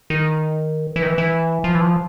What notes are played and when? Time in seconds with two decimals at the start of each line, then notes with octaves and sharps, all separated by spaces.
0.10 D#3
0.96 E3
1.03 D#3
1.08 E3
1.18 E3
1.64 F3
1.75 E3
1.81 F3